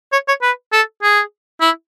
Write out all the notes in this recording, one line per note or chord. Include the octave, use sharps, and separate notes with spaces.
C#5
C#5
B4
A4
G#4
E4